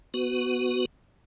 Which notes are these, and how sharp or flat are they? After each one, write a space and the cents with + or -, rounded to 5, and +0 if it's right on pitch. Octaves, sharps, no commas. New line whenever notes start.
B3 +0 F#4 +0 B4 +25